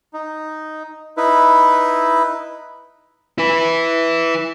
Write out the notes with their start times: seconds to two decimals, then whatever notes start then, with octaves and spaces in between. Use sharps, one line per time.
0.13 D#4
1.17 D#4 E4 B4
3.38 E4 B4